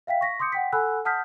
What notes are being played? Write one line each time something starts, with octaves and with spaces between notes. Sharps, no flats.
E5 F5 G5 B6
C#6 A#6 B6
C6 D6 D#6 G6 C#7
F#5 G5 B6
A4 F#5 G#5 B5 E6 F#6
F#5 A5 D#6 F6 G6 B6